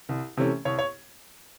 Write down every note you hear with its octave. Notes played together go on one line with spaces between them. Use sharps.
C2
C3 E3 A3 C#4
C2 C#5
C#5